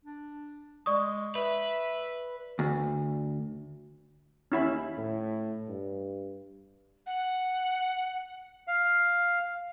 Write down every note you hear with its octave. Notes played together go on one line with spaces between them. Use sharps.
D4
G#3 D5 C#6 D#6
B4 E5
D2
D#2 C#4 E4 B5
A2
G2
F#5
F5